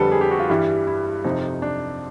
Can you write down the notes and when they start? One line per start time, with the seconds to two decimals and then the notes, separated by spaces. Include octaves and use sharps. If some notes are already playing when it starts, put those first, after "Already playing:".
Already playing: F2 D3 G3 A4 B4
0.12 G#4
0.21 G4
0.31 F#4
0.40 F4
0.50 G2 E3 G3 E4
0.87 E4
1.24 F2 C3 F3 D#4
1.62 D4